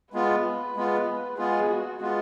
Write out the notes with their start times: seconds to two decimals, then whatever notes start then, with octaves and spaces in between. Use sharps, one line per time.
0.13 G#3 B3 F4 B4
0.77 G#3 B3 F4
1.38 G#3 B3 F4 G#4
1.69 F#4
2.01 G#3 B3 F4